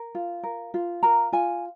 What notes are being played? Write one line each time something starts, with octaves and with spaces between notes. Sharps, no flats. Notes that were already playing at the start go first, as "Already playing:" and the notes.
Already playing: A#4
F4
A#4
F4
A#4 A#5
F4 G#5